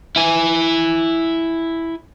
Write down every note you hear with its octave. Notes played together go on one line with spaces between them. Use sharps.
E4 G#5